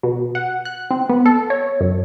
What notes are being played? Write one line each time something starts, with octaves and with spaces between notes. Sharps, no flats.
B2
F#5
F#6
C4
B3
A4
C#5
F#2